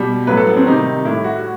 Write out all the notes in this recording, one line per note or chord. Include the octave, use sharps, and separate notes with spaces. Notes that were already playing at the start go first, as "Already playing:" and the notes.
Already playing: B2 G3
A2 F#3 B4
A4
B3
C4
C3 D#3 G3 D#4
A2 G3 E4
F#4